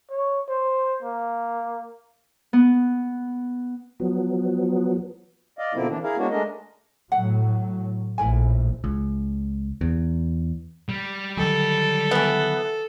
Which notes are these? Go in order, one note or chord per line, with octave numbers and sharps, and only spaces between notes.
C#5
C5
A#3
B3
F3 F#3 B3
D5 D#5 F5
B2 D3 F3 A#3 C4 E4
E3 D4
E4 G#4 A#4 F5
G#3 A#3 B3 C#4 D4 F#4
G#3 A3 D4 A#4 D#5
A2 F#3 F#5
A#1 A2 E4 A#4 G#5
C#2
E2
G3
D3 D#3 F#3 A4
E3 B3